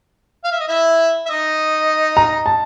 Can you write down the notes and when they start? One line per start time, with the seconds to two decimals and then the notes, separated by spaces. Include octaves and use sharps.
0.44 F5
0.52 E5
0.60 D#5
0.68 E4 E5
1.26 E5
1.30 D#4 D#5
2.17 A#5
2.46 A5